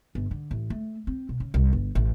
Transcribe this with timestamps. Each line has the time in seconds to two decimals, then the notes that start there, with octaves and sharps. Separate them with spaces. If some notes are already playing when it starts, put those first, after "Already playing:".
0.15 G1
0.31 D3
0.51 A1
0.70 A3
1.07 C4
1.29 B2
1.40 C#3
1.54 C2
1.73 G1
1.95 A1